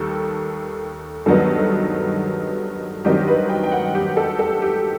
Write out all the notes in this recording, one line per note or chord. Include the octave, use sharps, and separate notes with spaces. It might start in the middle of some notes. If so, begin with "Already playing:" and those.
Already playing: D#2 D#3 G3 A4
G2 D#3 F#3 B3 D#4 A4
G2 D#3 F#3 C4 D#4 G4
B4
G5
G5
F#5
G4
A4
A4
G4